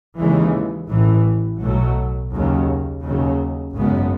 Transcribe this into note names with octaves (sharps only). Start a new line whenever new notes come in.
D#2 C#3 E3 G#3
A1 A2 E3
B1 B2 F#3 A3
D#2 C#3 F#3
D#2 C#3 F#3
G#1 F#2 C#3 G#3 B3